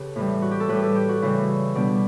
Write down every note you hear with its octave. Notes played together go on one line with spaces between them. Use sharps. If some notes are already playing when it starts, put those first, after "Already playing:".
Already playing: C#3 G4 A4 B4
A2 E3 G3
F#4
G4
A4
A2 G3 B4
G4
A4
G4
F#4
C#3 E3 G3 E4
B2 G3 D4